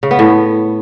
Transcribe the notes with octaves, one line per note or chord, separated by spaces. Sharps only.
C#3
B3
A2